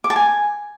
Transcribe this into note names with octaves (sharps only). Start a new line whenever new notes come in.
D6
A5
G#5